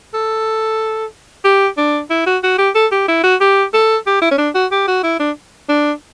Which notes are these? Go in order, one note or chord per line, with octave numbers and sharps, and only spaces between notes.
A4
G4
D4
E4
F#4
F#4
G4
A4
G4
E4
F#4
G4
A4
G4
E4
C#4
D4
F#4
G4
F#4
E4
D4
D4